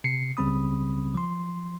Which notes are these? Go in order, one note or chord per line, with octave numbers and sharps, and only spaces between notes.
C3 C7 C#7
C#2 C#3 G3 C4 B5 D#6
F3 C6